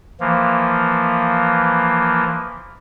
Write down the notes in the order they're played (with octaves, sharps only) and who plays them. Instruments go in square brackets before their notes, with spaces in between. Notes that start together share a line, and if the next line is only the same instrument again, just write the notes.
[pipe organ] E3 F3 A#3